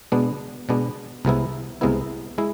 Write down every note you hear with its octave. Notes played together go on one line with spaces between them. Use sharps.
B2 G#3 B3 D4
B2 G#3 B3 D4
C2 C3 G#3 B3 E4
C2 C3 G#3 B3 E4
G#3 E4